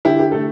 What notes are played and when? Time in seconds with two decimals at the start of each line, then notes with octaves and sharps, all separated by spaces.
0.05 D3 E4 G4
0.19 G4
0.32 A3 A4